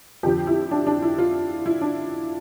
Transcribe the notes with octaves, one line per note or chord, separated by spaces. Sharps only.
F2 D3 F3 G4
E4
D4
D4
E4
F4
E4
D4